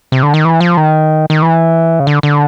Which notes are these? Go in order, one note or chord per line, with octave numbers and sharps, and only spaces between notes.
C3
D3
D#3
E3
F3
D#3
D#3
E3
C#3
D3
D3